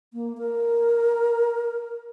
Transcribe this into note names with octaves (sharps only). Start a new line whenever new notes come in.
A#3
A#4